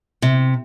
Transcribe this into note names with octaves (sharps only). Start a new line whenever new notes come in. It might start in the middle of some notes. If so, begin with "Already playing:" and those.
C3